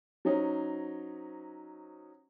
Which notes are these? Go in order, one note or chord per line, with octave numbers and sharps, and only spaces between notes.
F#3 C#4 D#4 C5